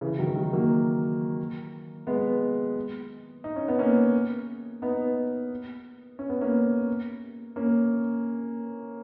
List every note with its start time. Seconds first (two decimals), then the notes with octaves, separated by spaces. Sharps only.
0.01 C#3 E3
0.18 D#3 F#3
0.35 D#3 F#3
0.53 F#3 A#3
2.07 G#3 B3
3.44 D#4
3.56 C#4
3.68 B3
3.79 A#3 C#4
4.82 B3 D#4
6.19 C#4
6.29 B3
6.41 A#3 C#4
7.56 A#3 C#4